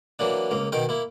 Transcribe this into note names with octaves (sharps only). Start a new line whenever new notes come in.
E3 F#3 A#3 D4
C#2 A#3
B2 D#3 A#4 G5
A#3 E4